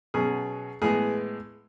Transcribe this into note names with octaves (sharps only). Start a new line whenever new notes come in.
B2 F#3 C#4 G#4
A2 E3 G#3 B3 G#4